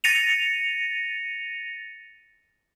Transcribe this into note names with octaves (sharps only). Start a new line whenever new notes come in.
A6 A#6 C#7 D#7 F7